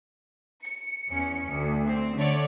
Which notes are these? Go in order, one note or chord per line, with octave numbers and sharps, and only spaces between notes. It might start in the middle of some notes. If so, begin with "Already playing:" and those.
C#7
E2 C#4
D2
C4
D3 A3 C#5 D5